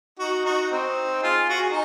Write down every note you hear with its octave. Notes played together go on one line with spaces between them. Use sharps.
D#4 F#4
D#4 F#4
C4 D#4
F4 G#4
F#4
G#4
D#4